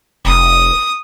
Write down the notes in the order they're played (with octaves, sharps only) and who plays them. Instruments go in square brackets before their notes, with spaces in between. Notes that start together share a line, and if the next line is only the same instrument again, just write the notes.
[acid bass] F1 [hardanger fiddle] D#6